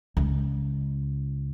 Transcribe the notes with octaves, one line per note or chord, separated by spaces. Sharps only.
C#2